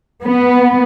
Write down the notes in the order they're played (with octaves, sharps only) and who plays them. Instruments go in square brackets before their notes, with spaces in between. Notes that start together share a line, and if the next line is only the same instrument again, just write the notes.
[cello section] B3